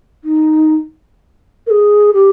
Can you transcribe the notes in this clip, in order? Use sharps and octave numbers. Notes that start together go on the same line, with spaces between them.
D#4
A#4
G#4
G4